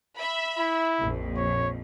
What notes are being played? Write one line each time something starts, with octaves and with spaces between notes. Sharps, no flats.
E5 B5
E4
A#1 F2
C#5